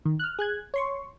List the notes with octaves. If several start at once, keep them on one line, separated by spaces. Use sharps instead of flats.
D#3
F6 F#6
G#4 F#6 G#6
C#5 C6 C#6